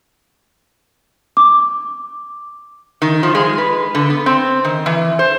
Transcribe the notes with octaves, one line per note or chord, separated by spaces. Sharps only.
D6
D#3
F3
G#3
B4
D3
B3
C4
D#3
E3
C5